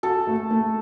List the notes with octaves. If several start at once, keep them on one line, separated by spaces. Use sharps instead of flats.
F#4 A4
A3
A3